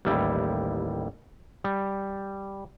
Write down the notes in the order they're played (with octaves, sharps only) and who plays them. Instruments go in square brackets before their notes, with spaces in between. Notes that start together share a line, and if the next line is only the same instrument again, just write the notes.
[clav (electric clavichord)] A1 D#2 G3 E4
G3